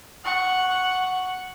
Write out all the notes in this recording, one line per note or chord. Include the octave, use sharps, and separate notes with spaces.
F#5 C#6